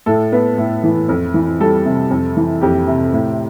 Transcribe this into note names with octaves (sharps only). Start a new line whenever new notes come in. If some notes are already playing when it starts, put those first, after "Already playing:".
A2 A4
B3
A2
E3
F2
E3
G3 A4
C3
F2
E3
F2 G4
C3
A2